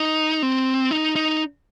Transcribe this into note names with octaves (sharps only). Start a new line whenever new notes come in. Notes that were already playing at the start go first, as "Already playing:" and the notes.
Already playing: D#4
C4
D#4
D#4